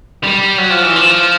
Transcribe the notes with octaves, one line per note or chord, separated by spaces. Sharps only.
G3
F#3
F3
E3
F3